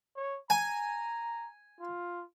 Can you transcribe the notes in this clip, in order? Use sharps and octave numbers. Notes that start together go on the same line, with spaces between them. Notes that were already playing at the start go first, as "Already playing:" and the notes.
C#5
G#5 A#5
F4